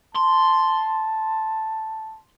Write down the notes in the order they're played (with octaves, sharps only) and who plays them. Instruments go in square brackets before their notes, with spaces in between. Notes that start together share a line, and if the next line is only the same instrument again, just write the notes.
[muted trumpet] A5 [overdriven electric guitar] C6